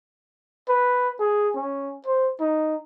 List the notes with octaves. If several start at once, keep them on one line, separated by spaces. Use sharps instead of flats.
B4
G#4
C#4
C5
D#4